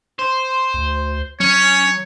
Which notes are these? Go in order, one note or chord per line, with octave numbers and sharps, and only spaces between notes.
C5
D2
F#3 C#4 C#5